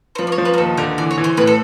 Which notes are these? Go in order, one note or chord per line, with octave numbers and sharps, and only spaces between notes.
C5
F3 B4
D5
C#5
F3
B4
A#4
D#2 A4
D3 A#4
E3 D5
C#5
E3
C5
A2 B4
A4